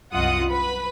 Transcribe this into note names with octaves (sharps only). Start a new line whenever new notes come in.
C2 F#2 F4 D#5 F#5 D#6
B4 B5